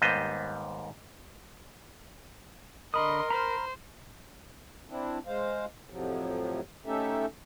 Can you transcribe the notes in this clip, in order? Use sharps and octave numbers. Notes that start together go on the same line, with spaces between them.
D#2 G#2 G3 B3 C5 D#5
D3 A#4 D#5 B5 C6 D#6
C5 A#5 B5 F6
C4 D4 E4
G#3 C5 F5
F2 A2 C3 F3 F#3
A3 C#4 D#4 G4 A4 E5